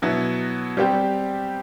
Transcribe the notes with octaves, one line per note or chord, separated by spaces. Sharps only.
B2 F#3 B3 E4
G3 C4 G4